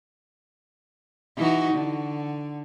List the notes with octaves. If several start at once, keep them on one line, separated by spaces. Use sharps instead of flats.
E3 D#4 F#4
D3